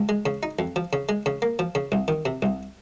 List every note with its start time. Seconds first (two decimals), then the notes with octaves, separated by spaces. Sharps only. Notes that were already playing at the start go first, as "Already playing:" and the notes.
Already playing: C#2
0.09 G#3
0.26 C#3
0.43 D#4
0.59 F2
0.76 F3
0.93 C#3
1.09 G#3
1.26 C#3
1.42 A#3
1.59 F3
1.75 C#3
1.92 C2
2.08 D#3
2.25 C3
2.42 C2